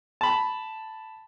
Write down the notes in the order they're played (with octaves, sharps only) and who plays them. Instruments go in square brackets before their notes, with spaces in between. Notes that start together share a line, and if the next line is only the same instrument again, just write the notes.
[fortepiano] A5 B5